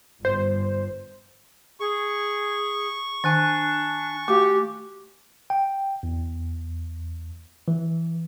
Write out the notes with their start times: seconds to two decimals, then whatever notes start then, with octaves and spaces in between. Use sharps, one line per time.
0.25 G1 G2 C5
1.80 G#4 C#6
3.24 D#3 D4 G#5 F#6 A6
4.28 A3 F#4 G4 F5 D6
5.50 G5
6.03 E2
7.68 E3